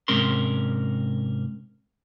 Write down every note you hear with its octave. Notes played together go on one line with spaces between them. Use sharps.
G#2 C3 C#4 A#4 C6